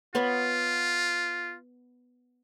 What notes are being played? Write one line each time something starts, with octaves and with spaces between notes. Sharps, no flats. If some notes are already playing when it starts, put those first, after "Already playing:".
B3 F4 C#5 B5